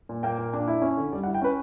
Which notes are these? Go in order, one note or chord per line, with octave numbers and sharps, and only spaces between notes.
A#2
A#3 G5
A#2
D4
E4
C#4
D3
G3 D5
F#5
E4
G5
C#4 B4